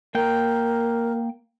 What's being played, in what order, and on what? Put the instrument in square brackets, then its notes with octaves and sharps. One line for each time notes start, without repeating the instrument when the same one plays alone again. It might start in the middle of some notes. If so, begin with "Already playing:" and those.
[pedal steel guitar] A#3 G5 [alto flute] A#4